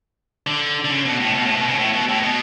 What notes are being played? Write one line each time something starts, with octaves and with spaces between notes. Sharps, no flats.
D3
D3
C#3
B2
A2
B2
A2
B2
C#3
A2
B2
A2
B2